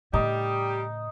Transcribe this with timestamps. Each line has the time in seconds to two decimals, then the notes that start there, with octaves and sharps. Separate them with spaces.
0.13 A2 C#3 G3 D#4 G4